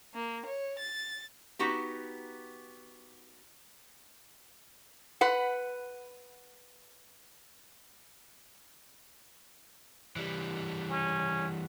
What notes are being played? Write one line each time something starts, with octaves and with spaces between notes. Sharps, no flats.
A#3
C#5
A6
B3 D#4 F#4 G4
B4 F#5
E3 G3
C#4